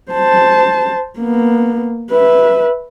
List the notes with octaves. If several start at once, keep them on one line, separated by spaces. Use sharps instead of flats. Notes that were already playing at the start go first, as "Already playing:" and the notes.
C5 A5
A#3 B3
B4 E5